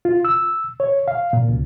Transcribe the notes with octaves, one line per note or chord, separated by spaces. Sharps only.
F4
E6
C#5
F5
A#2
C#2